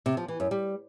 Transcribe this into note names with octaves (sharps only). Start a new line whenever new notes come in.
C3
F3
E3
F#2
G3